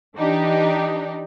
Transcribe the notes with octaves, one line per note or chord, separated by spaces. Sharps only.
E3 D4 D#4 G4